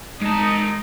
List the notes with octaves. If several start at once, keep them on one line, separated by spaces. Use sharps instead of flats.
G#3 D#4 A5